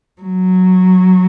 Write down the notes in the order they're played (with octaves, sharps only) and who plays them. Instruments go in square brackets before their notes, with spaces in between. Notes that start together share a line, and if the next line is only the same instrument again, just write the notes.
[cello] F#3